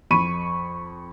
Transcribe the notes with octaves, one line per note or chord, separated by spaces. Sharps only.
F2 B5 C#6 D#7